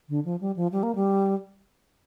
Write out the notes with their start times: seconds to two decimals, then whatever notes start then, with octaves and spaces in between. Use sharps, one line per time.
0.09 D3
0.25 F3
0.41 G3
0.56 F3
0.72 G3
0.83 A#3
0.95 G3